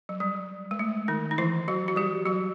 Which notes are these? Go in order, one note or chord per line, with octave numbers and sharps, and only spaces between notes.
F#3
G3
G#3
A3
D#3 D#4
D#4
E3 E4
F#3 F#4
F#4
G3 G4
F#3 F#4